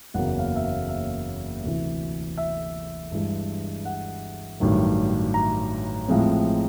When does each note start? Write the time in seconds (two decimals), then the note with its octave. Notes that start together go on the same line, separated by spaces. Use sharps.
0.14 F#1 E2 C#3 F#3 A#3 F#5
0.39 F5
0.56 E5
0.64 F5
0.89 E5
1.63 D2 C3 E3
2.37 E5
3.12 G2 E3 G#3
3.85 F#5
4.60 A1 G2 D#3 F#3
5.34 A#5
6.08 A1 A2 F3 G#3 C4